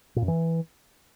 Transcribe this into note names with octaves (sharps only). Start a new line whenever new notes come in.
A#2
F#2
E3